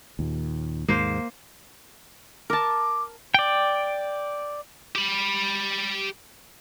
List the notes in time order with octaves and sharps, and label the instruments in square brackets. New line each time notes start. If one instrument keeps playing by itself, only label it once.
[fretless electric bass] D#2 A#2
[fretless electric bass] D#2 G#2 [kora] A#3 C5
[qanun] A#4 A5 [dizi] D6
[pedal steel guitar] D5 G5
[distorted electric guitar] G4 B5